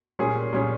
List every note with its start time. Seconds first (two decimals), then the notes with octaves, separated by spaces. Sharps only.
0.19 A#2 G3 C#4 G#4
0.53 A#2 G3 C#4 G#4